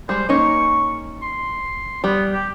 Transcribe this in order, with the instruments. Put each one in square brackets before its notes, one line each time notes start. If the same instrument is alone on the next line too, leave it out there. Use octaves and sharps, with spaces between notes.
[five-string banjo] G3 G#3 [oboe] C5
[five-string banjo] A#3 C#4 D#4 [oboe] C#6
[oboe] C6
[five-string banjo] G3 [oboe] B3
[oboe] G4